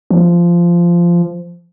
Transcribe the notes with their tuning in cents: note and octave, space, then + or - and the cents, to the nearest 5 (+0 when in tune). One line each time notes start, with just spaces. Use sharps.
F3 -15